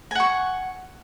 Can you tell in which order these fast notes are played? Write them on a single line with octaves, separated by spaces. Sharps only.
G#5 F#5 C#6